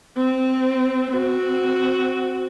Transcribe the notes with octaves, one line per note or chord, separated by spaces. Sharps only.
C4
C4 F#4